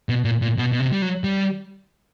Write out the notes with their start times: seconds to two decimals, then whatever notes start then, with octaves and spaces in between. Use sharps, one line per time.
0.09 B2
0.25 A#2
0.42 A#2
0.58 B2
0.72 B2
0.80 C3
0.93 G3
1.02 F#3
1.24 G3